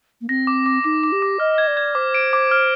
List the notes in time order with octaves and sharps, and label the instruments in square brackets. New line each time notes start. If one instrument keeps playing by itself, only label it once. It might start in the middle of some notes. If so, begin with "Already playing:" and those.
[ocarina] A#3
[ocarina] C4 [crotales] A#6
[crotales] D6
D6
[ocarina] D#4 [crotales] D6
[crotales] D6
[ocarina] G4
[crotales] D6
[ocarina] D#5 [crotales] F6
[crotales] G#6
[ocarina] D5
[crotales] G#6
[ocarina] C5 [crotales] D6
[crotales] D7
D6
F6